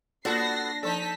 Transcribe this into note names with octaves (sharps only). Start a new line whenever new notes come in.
A#3 B3 D4 F4 F#4 A4 A#6 C7
F3 D#4 A4 D5 A5 B6